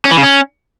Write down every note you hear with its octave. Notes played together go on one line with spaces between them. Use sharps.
C#4
E3
C#3
C#4